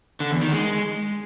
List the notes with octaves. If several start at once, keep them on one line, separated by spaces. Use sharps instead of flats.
D3
E2
D#3
G#3